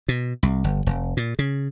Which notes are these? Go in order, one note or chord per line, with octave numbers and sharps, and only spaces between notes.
B2
C2
G1
F1
A#2
C#3